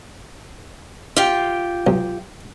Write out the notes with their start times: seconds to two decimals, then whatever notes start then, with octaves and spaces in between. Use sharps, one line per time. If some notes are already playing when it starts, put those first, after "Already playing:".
1.16 F4 G4 G5
1.87 B1